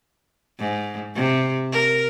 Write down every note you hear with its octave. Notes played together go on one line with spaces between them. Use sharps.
G#2
C3
A#4